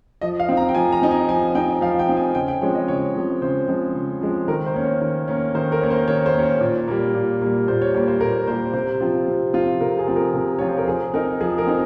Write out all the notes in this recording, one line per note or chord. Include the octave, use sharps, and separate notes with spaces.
F3 D#5
F5
C4 D#4
A#5
G5
F3 G#5
A#5
C4 D#4
G#5
F3 G#5
C4 D#4 G5
F3 F5
G5
C4 D#4
G#5
C#3 G5
G5
F3 G#3 C4 C#5
D#5
C#3 C#5
F3 G#3 C4
C#3 C5
F3 G#3 C4
C#3
F3 G#3 C4
D#3 A#4
C5
A#3 C#4
C#5
D#3
A#3 C#4
D#3 C5
A#4
A#3 C#4
C5
D#3 C#5
C5
A#3 C#4
C#5
A#2
G3 A#3
A#2
G3 A#3
A#2 C5
C#5
G3 A#3 C#5
C5
A#2 A#4
G3 A#3 C5
C3 C5
F3 C4 F4
C3
F3 C4 F4
C3 A#4
G#4
F3 C4 F4
A#4
C3
F3 C4 F4 C#5
C5
A#4
F3 G#4
C4 D#4 A#4
F3 G#4
A#4
C4 D#4